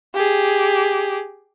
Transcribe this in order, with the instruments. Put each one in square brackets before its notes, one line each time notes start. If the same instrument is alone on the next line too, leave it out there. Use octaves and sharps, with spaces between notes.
[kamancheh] G4 G#4